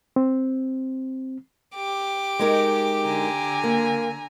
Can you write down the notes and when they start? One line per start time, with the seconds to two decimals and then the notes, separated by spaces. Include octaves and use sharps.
0.16 C4
1.75 G4 D6
2.39 G#3 D#4 A#4
3.06 D3 G#5 A#5
3.63 A#3